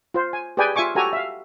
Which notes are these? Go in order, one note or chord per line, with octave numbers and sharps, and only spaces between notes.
F4 C5
G#5
G4 G#4 B4 D5 G5 G#5
F4 E5 G#5 C#6 D6
F#4 G4 A4 G#5 A#5
E5 F5